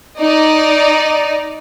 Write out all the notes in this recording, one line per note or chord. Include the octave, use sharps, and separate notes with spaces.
D#4 D5